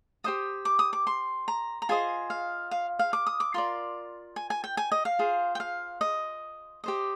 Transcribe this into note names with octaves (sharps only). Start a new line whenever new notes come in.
G4 C5 D#5 D#6
D6
D#6
D6
C6
A#5
A#5
F4 G#4 C5 D#5 G#5
F5
F5
F5
D6
D#6
D6
F4 A#4 D5 C6
G#5
G#5
G5
G#5
D#5
F5
F4 G#4 C5
G5
F5
D#5
G4 C5 D#5